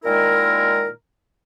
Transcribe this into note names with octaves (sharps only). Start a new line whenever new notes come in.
A#2 D#3 G#3 E4 A#4